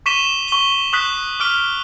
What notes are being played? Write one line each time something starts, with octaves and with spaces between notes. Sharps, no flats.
C#6 D6 B6 D#7 E7 G7
C#6 G7
C#6 D#6 F#6 B6
D6 F6 D7 G7